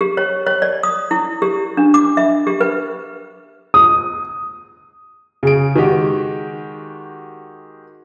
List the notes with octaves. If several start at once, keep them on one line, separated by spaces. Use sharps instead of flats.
G4
C#5
C#5
D5
D#6
E4
G4
D4
D6
E5
G4
B4
D#6
C#3 G#4 D7
D#3 G#3 F#4 G4